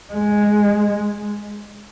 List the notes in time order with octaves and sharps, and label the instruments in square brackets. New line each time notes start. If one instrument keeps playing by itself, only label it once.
[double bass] G#3